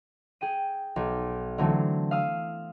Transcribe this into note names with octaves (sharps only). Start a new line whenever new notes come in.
G#4 G5 D#7
B1
D3 E3 F#3 A3 C4
F5 D#6 E6